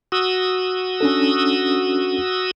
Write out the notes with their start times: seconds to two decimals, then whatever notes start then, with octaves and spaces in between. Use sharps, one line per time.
0.12 F#4 D#6 E6
1.01 C#4 D4 A4